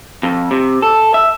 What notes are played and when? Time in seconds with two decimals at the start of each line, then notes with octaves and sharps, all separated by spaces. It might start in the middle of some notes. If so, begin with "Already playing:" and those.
0.23 F2
0.51 C3
0.82 A4
1.14 E5